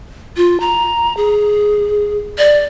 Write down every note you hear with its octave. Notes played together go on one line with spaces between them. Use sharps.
F4
A#5
G#4
D5